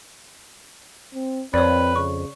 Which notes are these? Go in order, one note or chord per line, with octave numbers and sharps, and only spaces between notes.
C4
F2 C4 B4 C#5 D5
C#3 C#6